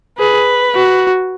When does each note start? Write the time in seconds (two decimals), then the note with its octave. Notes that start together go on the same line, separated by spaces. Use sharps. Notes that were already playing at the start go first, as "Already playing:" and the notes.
0.19 G#4 B4
0.75 F#4